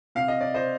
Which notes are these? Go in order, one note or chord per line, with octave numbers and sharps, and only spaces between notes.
C3 F5
D#5
D5
C5 D#5